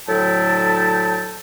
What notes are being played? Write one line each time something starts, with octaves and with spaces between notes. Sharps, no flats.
D2 A2 F#3 E4 G5 A5